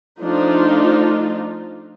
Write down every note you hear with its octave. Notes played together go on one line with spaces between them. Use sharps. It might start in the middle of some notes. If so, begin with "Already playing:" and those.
F3 A3 D4 D#4 F4